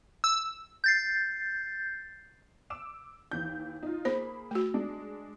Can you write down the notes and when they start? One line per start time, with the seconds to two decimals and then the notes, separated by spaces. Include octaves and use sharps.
0.24 E6
0.84 G6 A6 C7
2.70 D6 E6 E7
3.32 D#2 E3 G6
3.83 D#4 F4
4.05 A#3 G#4 C5 B5
4.51 A3 F#4
4.74 G#3 D4